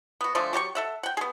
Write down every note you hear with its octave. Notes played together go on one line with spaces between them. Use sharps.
B3 F#4
D3 F3 G#3 A3
F#3 G4 B4 C#6
A4 E5 F#5
F#5 G5
B3 G#4